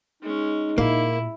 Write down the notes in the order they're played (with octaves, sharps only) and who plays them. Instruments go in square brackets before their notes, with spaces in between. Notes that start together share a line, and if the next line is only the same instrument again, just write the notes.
[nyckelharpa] G#3 C#4 [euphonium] D#4
[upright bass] A#2 [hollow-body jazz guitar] A#3 [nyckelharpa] E4